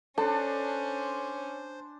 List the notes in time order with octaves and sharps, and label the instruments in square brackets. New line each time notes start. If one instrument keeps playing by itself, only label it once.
[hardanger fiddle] C#4 [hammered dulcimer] D4 [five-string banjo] A4 [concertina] C5